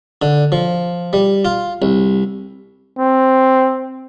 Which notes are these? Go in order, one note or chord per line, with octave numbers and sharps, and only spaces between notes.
D3
F3
G3
F4
C2
C4